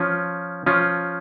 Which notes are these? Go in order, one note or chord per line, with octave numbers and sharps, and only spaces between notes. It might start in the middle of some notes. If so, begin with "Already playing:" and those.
Already playing: F3 C#4 F4
F3 C#4 F4